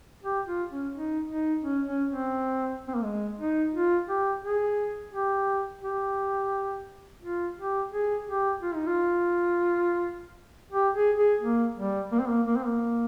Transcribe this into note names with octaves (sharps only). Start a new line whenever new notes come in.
G4
F4
C#4
D#4
D#4
C#4
C#4
C4
C4
A#3
G#3
D#4
F4
G4
G#4
G4
G4
F4
G4
G#4
G4
F4
D#4
F4
G4
G#4
G#4
A#3
G3
A#3
C4
A#3
A#3
C4
A#3